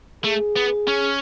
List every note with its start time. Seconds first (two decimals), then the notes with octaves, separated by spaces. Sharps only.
0.24 A3 G#4
0.56 B3
0.88 C#4